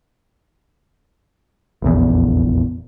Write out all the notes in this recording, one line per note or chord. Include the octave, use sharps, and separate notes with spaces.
F1 A#1 E2